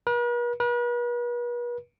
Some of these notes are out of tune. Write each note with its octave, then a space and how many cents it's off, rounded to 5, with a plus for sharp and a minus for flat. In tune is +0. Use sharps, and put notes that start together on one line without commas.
B4 -45
B4 -40